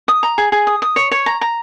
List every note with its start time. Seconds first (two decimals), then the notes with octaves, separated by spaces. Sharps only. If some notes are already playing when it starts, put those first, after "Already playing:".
0.08 D#6
0.23 A#5
0.38 G#4
0.52 G#4
0.67 D#6
0.82 D#6
0.96 C#5
1.11 C#5
1.26 A#5
1.41 A#5